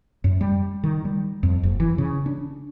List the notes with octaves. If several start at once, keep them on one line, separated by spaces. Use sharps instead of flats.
F#2
G3
D#3
G3
F2
F#1
E3
C#3
D4